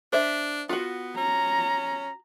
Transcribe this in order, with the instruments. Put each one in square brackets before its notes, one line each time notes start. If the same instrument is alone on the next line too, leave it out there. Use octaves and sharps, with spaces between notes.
[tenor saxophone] D4 [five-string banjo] C5 E5
[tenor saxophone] B3 [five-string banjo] F4 F#4
[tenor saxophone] C#4 [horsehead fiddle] A#5